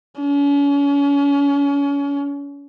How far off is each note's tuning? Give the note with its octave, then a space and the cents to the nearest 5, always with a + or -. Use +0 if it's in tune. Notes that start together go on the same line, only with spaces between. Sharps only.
C#4 +35